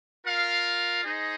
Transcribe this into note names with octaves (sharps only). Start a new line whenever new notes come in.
F4 A#4 F5
D#4 G#4 C5 D#5